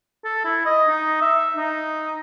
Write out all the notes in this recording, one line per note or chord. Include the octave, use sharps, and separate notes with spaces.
A4
E4
D#5
D#4
E5
D#4